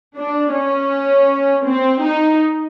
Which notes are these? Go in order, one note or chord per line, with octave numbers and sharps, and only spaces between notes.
D4
C#4
C4
D#4